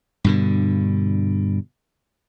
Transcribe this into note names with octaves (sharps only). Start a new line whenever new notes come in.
G2 B2 D3